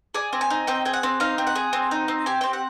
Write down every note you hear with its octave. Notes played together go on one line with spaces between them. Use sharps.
G#4 D5
C4
G#5
D#4
C4 G5
G#4 G5
F#5
C4
D#4 F5
C4
F#5
G#4
C4
D#4
C4
G4 G#5
C4 G5
F#5